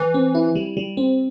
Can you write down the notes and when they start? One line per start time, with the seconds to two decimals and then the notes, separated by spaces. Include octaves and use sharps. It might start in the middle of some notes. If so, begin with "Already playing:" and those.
Already playing: E3
0.14 C4
0.35 E4
0.55 G3
0.77 G3
0.97 C4